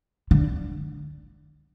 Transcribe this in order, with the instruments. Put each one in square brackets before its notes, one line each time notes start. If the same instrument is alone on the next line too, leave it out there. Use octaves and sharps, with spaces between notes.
[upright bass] D3